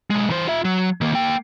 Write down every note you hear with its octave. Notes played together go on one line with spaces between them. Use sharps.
B1 G#3
E3 C5
F4 E5
F#3
D#3 A#3
A#3 G5